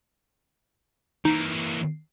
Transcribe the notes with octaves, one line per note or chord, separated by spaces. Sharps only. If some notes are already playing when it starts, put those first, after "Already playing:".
E3 A#3 D#4